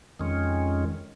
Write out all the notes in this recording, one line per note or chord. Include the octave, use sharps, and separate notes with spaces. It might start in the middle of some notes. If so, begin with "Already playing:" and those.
F2 D#3 G#3 C#4